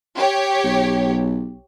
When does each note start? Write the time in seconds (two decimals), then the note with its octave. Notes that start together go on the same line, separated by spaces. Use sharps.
0.16 G4 C#5
0.64 B1